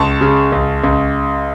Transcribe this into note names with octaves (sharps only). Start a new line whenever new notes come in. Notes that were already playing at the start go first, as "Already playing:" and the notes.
Already playing: C#2 A5 C#6
C#3
C#2
C#2